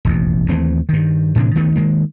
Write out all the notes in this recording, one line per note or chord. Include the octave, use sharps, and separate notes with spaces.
E1 A1 D#2
D#2 E3 A3 C4
G2 D#3
A2 C3 E3 D4
D2 D#3 A3 B3
D#3 G#3 A#3